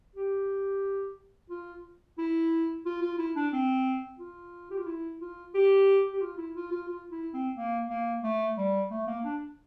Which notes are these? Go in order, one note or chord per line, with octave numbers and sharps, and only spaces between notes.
G4
F4
E4
F4
F4
E4
D4
C4
F4
G4
F4
E4
F4
G4
G4
F4
E4
F4
F4
F4
E4
C4
A#3
A#3
A3
G3
A3
A#3
D4